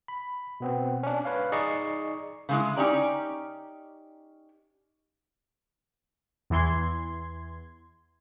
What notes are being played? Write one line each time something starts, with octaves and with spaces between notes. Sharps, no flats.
B5
B2 B3 C4
C#4 D4
B4 C#5 F5
D#4 G#4 D5 D#5 C#6 C7
C#3 G#3 E4
C#4 D#4 G4 D5 A#5
E2 E3 C6 G#6